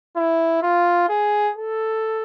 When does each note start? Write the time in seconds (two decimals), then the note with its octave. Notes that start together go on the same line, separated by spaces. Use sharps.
0.16 E4
0.62 F4
1.09 G#4
1.57 A4